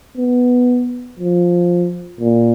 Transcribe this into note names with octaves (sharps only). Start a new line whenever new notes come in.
B3
F3
A#2